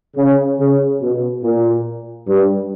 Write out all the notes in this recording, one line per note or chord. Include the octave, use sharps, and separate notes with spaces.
C#3
C#3
B2
A#2
G2